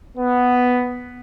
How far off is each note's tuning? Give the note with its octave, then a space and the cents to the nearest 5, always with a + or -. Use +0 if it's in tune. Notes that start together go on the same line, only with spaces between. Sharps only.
B3 +5